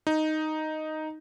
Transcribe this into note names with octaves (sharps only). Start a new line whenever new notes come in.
D#4